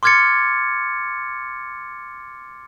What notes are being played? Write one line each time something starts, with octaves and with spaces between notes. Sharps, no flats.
C6 D6 F6 G#6 A6 C#7